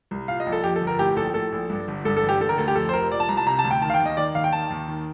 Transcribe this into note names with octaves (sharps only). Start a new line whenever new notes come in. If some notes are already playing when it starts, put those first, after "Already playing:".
C2
A#2 F5
D#5
A#1
A4
F2 G4
A4
G1
A#4
A2 G4
A#1 A4
A2 A4
A#1
G2
G1
G2 A4
A4
A1
G4
D3 A4
A#4
D2 A4
G4
F2 A4
C5
F1 A#4
A#2 D5
A5
C2 A#5
A5
C3 A#5
A5
D2
G5
D#3 A5
F5
G5
D#2
D#5
D#3 D5
D#2 F5
G5
D#3 A5
D#2
D#3